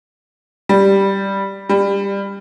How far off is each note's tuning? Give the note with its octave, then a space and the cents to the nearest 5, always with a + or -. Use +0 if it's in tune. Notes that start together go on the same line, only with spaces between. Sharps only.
G3 +0
G3 +20